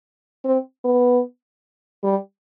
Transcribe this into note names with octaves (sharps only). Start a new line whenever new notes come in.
C4
B3
G3